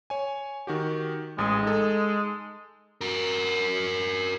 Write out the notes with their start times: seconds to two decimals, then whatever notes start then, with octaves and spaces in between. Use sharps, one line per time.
0.10 C#5 G#5
0.67 D#3 F#4 G4
1.38 A1 G#3 D#6
1.63 D#4 A4
3.01 F#4 A#4